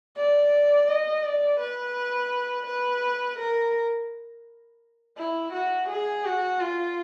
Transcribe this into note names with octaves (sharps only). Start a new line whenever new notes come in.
D5
D#5
D5
B4
B4
A#4
E4
F#4
G#4
F#4
F4